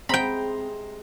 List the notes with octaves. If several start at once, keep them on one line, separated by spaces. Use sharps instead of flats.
C3 G#3 C4 C5 D#5 G5 A#5 B5